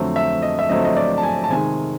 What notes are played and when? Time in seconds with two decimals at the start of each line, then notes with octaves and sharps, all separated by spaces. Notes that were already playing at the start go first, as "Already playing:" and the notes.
Already playing: F2 D3 F#3 A3 C4
0.16 E5
0.42 D#5
0.59 E5
0.69 F2 D3 F#3 A3 C4 D#5
0.85 D#5
0.96 D5
1.18 A5
1.23 G#5
1.44 A5
1.51 C3 D#3 G#3 G#5